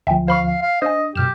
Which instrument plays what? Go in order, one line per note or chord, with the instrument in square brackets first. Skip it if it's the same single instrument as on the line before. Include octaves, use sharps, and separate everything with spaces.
[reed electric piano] D2 F3 [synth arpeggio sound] E5 G5 G#5
[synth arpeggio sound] C5 B5 C#6 [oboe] F5
[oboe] F5
F5
[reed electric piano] D4 [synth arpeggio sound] C5 G#5 [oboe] D#5
[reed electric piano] F#2 [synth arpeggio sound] B2 F6 E7 [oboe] G4